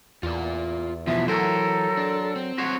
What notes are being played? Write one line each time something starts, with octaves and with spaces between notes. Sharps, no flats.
E2 F4 D5
B2 E3 F3 E5
F#3 A4 A#4 C5
D4
C4
F#4 C5 C#5 F#5